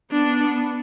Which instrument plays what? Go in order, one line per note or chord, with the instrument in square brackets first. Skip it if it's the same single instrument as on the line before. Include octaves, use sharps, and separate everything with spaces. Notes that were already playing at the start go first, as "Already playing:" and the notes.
[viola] B3 [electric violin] D4